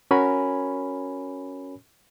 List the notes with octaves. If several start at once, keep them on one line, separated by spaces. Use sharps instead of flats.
C#4 F#4 A#4 C#5 G#5 B5